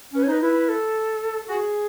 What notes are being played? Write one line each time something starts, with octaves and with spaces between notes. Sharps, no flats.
C#4 B4
C#5
D#4 B4
E4 B4
A4
F#4 G#4